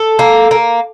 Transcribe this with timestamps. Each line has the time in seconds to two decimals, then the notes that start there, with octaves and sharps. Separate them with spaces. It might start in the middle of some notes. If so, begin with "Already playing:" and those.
Already playing: A4
0.19 A#3
0.51 A#3